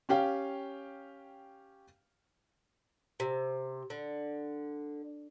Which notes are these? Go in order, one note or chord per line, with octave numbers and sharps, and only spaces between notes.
C#4 G4 F5 G5
C3
D3